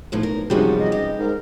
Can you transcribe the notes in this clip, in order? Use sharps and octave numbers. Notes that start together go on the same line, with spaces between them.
B1 E2 A2 F3
A#4
F#2 C3 F3 G3 G#3 B3 D#4 F#4
D#5
G4 D#5
G#2 A#4